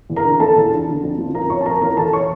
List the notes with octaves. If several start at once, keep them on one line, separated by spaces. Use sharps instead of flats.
E2
A#4 A#5
D3
F3 A4 A5
E2
D3
D3
F2
F3
F2 A#4 A#5
F2 C#5 C#6
A5
F2 A#4 A#5
E3 A#4 A#5
E2 A4 A5
C#5 C#6